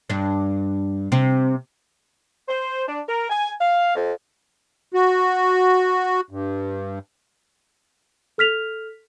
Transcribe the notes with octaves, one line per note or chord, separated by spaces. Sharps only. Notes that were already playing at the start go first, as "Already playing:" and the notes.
G2 D4
C3 C4
C5
D4
A#4
G#5
F5
F2
F#4
G2
A4 F6 B6 F7